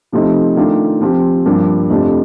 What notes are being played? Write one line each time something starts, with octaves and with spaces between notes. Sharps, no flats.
C3 F3 A3 C4 D#4
D#3 A3 D4 F4
F3 C4 G4
G2 F3 A#3 D4
F2 C3 F3 A3 D4